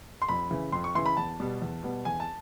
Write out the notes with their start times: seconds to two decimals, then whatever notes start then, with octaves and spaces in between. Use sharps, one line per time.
0.22 C6
0.29 F2 B5
0.51 C#3 E3
0.72 F2 C6
0.84 C#6
0.95 C#3 E3 C6
1.06 B5
1.17 E2 A5
1.40 B2 G3 B3
1.62 E2
1.83 B2 G3 B3
2.05 E2 G#5
2.20 A5